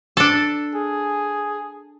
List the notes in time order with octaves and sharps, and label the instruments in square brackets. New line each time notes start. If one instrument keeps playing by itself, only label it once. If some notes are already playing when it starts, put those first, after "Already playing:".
[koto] D4 A4
[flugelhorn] G#4